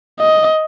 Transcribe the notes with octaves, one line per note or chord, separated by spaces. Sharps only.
D#5